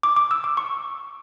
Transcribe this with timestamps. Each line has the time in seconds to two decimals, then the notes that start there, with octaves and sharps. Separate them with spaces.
0.03 D6
0.16 D6
0.31 E6
0.44 D6
0.57 C#6